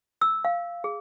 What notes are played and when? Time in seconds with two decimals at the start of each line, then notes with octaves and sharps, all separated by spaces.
0.21 E6
0.45 F5
0.84 G#4